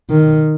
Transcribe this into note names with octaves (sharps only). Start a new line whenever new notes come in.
D#3